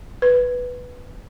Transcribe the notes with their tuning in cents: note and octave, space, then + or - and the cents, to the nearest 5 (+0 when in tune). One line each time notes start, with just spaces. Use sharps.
B4 +0